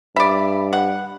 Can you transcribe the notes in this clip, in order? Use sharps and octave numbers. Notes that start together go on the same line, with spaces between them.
G2 D5 E5 B5
F#5